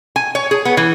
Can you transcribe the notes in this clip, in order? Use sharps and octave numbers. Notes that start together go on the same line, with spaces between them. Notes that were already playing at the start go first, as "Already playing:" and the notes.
G#5
C#5
G#4
B3
E3